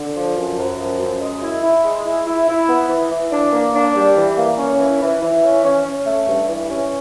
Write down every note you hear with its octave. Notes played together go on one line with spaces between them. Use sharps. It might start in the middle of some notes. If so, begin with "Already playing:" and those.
Already playing: D3
F3
F#2
F#2
F3
F#2
G#3
E4
E4
G#3
E4
E4
E4
B3
E3
E3
D4
A#3
D4
G3
E3
A#3
C#4
E3
E3
E3
C#4
C#4
C#4
A3
G2
E3
C#4